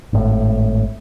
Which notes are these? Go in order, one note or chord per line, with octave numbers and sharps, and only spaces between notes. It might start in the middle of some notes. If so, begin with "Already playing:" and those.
G#1 A2